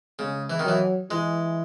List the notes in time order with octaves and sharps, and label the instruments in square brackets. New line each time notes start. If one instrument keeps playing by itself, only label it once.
[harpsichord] C#3 [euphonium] G#3
[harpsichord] E3
D#3
[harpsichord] E3 [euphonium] F#3
[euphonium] E3 [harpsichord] G#3